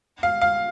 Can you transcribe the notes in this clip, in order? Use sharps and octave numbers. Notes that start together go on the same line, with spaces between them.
F5
F5